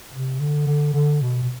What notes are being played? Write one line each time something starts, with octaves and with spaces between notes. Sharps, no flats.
C3
D3
D3
D3
B2
B2